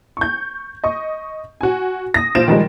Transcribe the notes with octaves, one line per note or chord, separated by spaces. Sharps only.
C#6 G6
D#5 C#6
F#4 G#5
D#6 A#6
A#1 F4 C5 D7 E7
D#3 F3 G3 G#3